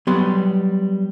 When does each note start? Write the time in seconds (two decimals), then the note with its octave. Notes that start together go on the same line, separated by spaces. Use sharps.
0.07 F#3 G3 B3 C6